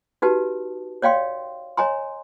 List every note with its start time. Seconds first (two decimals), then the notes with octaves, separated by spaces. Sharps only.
0.22 D#4 F#4 G4 B4 A5
1.02 C#5 D5 F5 G5 C6
1.77 C#5 D#5 G#5 A#5 C6